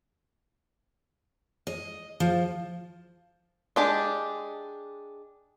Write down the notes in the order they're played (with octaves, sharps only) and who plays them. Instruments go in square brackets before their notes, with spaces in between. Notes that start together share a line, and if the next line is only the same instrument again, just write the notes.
[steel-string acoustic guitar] D#5
F3
[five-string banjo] G#3 D4 G4